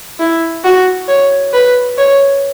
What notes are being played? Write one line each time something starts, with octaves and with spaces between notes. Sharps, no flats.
E4
F#4
C#5
B4
C#5